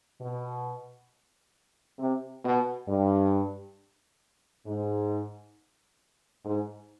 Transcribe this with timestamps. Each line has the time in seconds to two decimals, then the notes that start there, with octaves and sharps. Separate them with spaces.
0.20 B2
1.99 C3
2.44 B2
2.88 G2
4.66 G#2
6.45 G#2